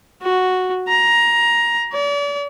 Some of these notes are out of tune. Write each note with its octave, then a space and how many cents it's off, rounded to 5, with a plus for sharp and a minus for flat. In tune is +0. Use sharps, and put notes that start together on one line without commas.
F#4 -5
A#5 +15
D5 -40